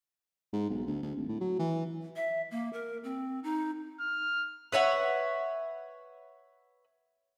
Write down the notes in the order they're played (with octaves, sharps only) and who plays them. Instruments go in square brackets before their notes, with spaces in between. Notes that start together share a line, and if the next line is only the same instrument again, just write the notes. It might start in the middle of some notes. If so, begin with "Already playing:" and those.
[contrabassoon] G#2
B1
D2
D2
G#1
A2
F#3
E3
[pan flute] E5
A#3
A#4
C4
D#4
[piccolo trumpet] F6
[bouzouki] B4 C#5 E5 F#5